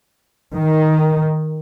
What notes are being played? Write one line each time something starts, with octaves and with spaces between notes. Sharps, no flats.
D#3